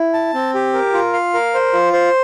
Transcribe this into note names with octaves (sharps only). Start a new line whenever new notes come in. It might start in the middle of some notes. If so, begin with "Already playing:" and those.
Already playing: E4
A5
C4
G4
A#4
F4
F5
A#4
C5
F4
C5